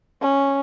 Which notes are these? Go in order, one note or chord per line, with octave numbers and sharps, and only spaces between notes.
C#4